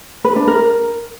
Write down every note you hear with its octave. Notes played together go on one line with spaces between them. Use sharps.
B4
D4
A#4